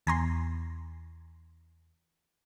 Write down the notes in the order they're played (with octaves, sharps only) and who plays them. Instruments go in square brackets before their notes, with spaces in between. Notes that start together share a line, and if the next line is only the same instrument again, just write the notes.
[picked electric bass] E2 [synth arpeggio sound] G#5 A#5 C6